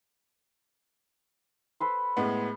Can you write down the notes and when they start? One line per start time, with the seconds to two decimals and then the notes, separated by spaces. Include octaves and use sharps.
1.80 A4 B4 C5
2.17 A2 G#3 B3